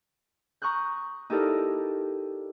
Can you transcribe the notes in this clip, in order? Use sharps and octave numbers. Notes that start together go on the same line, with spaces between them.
A#5 C#6 D#6 F#6 G6
D#4 E4 G4 A4 A#4 D5